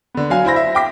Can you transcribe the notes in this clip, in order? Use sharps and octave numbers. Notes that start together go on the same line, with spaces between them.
D3 B3
F#3 F5 G#5
E4 C5 B5 A#6
E5
G5 D6 B6